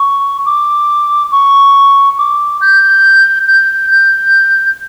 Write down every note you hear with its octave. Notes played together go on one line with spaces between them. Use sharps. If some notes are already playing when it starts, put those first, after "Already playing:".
Already playing: C#6
D6
C#6
D6
G6
G6
G6